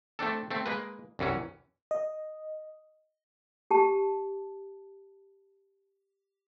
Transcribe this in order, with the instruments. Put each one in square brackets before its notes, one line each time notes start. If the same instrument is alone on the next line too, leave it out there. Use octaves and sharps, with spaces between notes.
[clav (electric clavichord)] A3 C4 D4 A4
A3 C4
G#3 A#3 B4
C2 F#2 E3 C#4
[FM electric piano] D#5
[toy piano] G4 A5